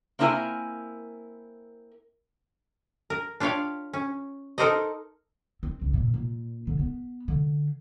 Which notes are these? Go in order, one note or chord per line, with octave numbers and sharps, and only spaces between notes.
A#3 C4 D4 E4 A#4 G#5
A#4
D4 F4 G4 C#5 D5 F5
C#4
D#4 A4 A#4 C5 D5 D#5
C4
C#2
A#2
A#2
D3
B3
D3